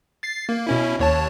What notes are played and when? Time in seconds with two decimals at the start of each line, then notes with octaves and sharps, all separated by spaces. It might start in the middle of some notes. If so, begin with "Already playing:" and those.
0.23 A6 C7
0.49 A#3
0.67 B2 C#4 E4
0.99 D#2 C#5 A5